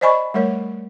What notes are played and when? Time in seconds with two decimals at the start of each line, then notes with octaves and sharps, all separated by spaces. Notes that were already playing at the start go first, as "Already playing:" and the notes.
0.01 C5 D5 D#5 G#5 B5 C#6
0.34 G3 A3 A#4 C#5